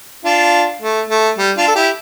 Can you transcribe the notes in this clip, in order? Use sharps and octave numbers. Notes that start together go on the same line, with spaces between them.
D4 F4
A3
A3
G3
D4 F4
A4
E4 G4